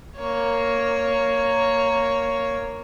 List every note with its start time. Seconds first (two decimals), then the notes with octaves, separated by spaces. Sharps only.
0.17 A#3 C#5